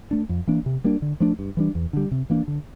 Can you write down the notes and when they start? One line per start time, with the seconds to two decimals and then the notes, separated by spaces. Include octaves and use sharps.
0.11 A3 D4
0.29 F2
0.47 E3 A#3 D4
0.66 C3
0.84 G3 A#3 D4
1.02 D3
1.20 F3 A3 D4
1.39 G2
1.57 E3 G3 D4
1.75 E2
1.93 D3 G3
2.11 C3
2.30 E3 A#3 D4
2.48 D3